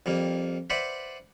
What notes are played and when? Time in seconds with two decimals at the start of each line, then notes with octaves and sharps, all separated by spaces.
0.06 F2 G3 A#3
0.70 B4 C5 D5 E5 F#5